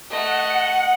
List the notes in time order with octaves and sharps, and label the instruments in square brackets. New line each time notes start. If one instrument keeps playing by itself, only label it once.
[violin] A3 D#5 [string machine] F#5